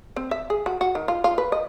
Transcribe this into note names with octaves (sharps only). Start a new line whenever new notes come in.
C4
E5
G#4
F#4
F#4
D#3
F4
F4
B4
D#5